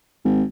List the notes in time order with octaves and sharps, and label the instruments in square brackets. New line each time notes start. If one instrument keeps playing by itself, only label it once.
[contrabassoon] G#1